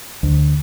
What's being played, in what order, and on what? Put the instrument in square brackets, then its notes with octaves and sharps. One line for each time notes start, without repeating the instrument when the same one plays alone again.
[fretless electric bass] D2